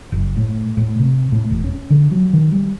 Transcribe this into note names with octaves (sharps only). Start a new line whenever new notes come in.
F#1
A2
A2
C3
A2
E1
C#4
D3
F#3
D#3
G3